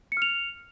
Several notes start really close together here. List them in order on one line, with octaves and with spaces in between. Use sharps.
C#7 F6 F7